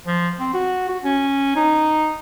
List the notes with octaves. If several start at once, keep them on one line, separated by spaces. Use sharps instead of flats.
F3
C4
F#4
F#4
C#4
D#4